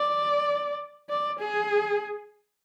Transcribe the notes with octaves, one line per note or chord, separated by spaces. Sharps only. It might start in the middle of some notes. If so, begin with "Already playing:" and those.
Already playing: D5
D5
G#4